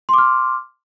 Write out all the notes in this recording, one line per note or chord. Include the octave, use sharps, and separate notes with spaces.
C6 D6 F6